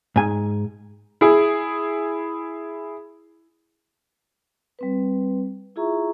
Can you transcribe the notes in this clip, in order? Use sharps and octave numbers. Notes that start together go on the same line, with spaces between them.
G#2 G#5
E4 G#4
G3 C4 B4
E4 F4 G#4 E5 A#5 C#6